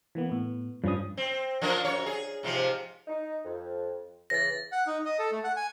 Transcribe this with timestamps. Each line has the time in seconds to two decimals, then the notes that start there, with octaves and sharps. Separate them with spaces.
0.15 E3 A#3 B3
0.29 A2 B3
0.84 G2 F3 C#4 D#6
1.17 C4
1.62 F3 D4 A#4
1.85 F#2 C#5
2.06 G#4
2.43 G#2 C3 F3
3.07 D#4
3.44 F2
4.30 C#3 E3 A6 A#6
4.72 F#5
4.87 D#4
5.05 D#5
5.19 A4
5.32 A3
5.44 F#5
5.56 G#5